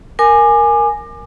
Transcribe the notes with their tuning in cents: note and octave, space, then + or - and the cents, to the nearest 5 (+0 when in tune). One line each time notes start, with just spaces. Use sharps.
A#4 +0 G#5 +0 D6 +30